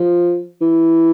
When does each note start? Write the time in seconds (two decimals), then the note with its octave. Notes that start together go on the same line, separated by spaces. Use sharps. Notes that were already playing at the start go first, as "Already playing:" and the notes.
Already playing: F3
0.62 E3